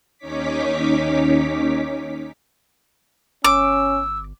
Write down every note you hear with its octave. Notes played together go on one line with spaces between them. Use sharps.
D#2 C#4 D#4 C#5 D6 B6
G1 C#4 D6 E6